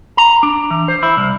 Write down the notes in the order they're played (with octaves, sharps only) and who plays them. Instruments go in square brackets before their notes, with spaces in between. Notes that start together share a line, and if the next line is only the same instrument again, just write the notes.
[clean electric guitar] A#5
D4
E3
C5
E4
C2